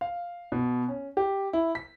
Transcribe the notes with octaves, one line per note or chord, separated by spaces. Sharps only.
F5
B2
C#4
G4
E4
B6